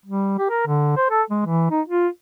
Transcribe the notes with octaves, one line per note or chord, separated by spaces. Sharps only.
G3
G4
A#4
D3
C5
A4
G#3
E3
D#4
F4